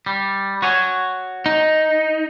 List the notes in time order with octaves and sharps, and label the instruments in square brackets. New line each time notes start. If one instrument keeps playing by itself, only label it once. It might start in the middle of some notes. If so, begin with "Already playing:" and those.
[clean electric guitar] G3
F#4 C#5 G#5
[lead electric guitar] D#4